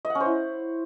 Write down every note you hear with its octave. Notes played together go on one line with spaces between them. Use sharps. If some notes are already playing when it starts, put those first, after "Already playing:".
D#5
F#5
C#4
C5
E4